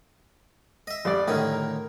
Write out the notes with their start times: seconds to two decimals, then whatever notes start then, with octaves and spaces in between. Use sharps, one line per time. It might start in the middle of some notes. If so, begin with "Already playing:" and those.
0.87 D#5 E5
1.05 F2 G3 D5
1.28 A2 D3 D#3 D#5 F6
1.53 A#4